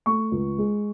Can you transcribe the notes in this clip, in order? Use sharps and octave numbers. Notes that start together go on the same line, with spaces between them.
A3 C#6
C#2
G#3